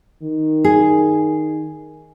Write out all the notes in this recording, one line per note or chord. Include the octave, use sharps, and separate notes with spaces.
D#3
G#4